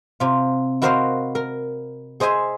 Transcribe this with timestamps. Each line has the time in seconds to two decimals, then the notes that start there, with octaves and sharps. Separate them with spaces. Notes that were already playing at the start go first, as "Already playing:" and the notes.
0.20 C3 F4
0.82 E4 F#4 A#4 C5 D#5 F5
1.35 A#4
2.20 G#4 C5 D#5 E5 G#5